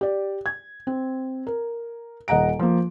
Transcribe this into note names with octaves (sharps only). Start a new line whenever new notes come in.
G4 D5
G#6
C4
A#4
D#1 D#5 F#5 A#5 D7
F3 A#3